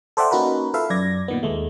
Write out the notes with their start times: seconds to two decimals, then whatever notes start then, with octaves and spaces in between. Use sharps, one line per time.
0.17 A4 C5 D5 E5 F#5 G5
0.31 A#3 C#4 D#4 F#4 A#4 B4
0.74 F4 A4 B4 E5 F5
0.90 F#2 D5 G#6 A#6
1.28 A#2 D#3 B3
1.43 D#2 G#3 A3